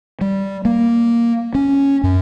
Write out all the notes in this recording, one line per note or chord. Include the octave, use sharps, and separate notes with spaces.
G3
A#3
C#4
F#2